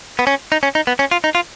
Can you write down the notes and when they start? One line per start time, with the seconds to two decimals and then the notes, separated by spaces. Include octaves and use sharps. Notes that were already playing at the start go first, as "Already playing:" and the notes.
0.19 B3
0.27 C#4
0.52 D#4
0.63 C#4
0.75 D#4
0.87 B3
0.99 C#4
1.11 F4
1.24 D#4
1.35 F4